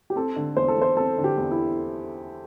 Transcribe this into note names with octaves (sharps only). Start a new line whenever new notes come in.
G4
C4 A4
D3
E2 C5
A4
E2
C5
C4 A4
D3
G4
E2
E4